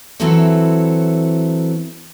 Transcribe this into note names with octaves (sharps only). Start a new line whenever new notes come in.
E3 F#3 C4 E4 A4 C#5